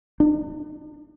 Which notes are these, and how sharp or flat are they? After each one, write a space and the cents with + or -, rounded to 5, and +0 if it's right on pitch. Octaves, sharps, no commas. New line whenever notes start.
D4 +45